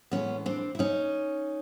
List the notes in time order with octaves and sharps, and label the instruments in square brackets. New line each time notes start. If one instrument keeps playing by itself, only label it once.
[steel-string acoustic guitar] A2 E3 G#3 B3 C#4
C4 D4
E4
C#4 D#4